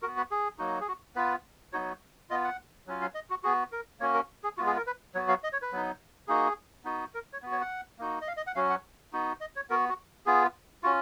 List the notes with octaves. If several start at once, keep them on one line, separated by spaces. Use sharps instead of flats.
B3 F#4 A#4
B4
G#4
F#3 A#3 D#4 F#4
G#4
F#4
B3 F4 B4
F#3 B3 D#4 F#4 C#5
B3 F4 D#5
F#5
F#3 C#4 F4
F5
D#5
F#4
B3 F#4 G#4
A#4
A#3 C#4 F#4 C#5
A#4
G#4
G#3 B3 F4 F#4
G#4
A#4
B4
F#3 B3 F#4 C#5
F5
D#5
C#5
B4
F#3 B3 D#4
A#3 D#4 F#4 G#4
B3 D#4 F#4
A#4
C#5
B3 F#4
C#5
F#5
A#3 D#4 F#4
D#5
F5
D#5
F#5
F#3 C#4 F#4 F5
F#5
B3 D#4 F#4
D#5
C#5
B3 F#4 A#4
F#4
B3 F4 G#4
C#4 F4 F#4